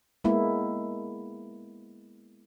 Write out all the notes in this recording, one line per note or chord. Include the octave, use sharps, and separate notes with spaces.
G#3 A#3 B3 E4